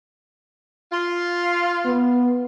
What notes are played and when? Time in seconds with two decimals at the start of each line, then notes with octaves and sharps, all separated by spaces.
0.92 F4
1.86 B3